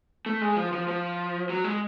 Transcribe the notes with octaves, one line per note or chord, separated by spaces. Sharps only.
A3
G#3
F3
F3
F3
F#3
G#3